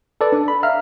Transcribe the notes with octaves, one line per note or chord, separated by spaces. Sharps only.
A4 B4 D5
D4
B5
E5 F5 A#5 F6